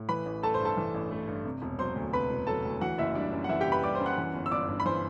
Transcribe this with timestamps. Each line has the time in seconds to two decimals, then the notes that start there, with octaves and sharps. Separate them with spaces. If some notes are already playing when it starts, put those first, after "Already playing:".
Already playing: A2
0.09 E3 B4 B5
0.26 A1
0.43 A3 A4 A5
0.54 C5 C6
0.60 G2
0.65 A4 A5
0.77 E3
0.94 A1
1.11 A3
1.27 G2
1.45 C3
1.62 E1
1.78 F#3 C5 C6
1.96 D2
2.13 C3 B4 B5
2.30 E1
2.47 F#3 A4 A5
2.65 D2
2.81 E3 F#4 F#5
2.98 F#1 E4 E5
3.15 G3 D4 D5
3.32 F#2
3.44 F#5
3.49 E3 E4 E5
3.61 G4 G5
3.66 F#1
3.72 B4 B5
3.83 G3 D5 D6
3.95 C5 C6
4.00 F#2
4.06 F#5 F#6
4.18 E3
4.34 G1
4.46 E6
4.51 G1 D5 D6
4.68 G2
4.80 B5
4.86 E3 C5 C6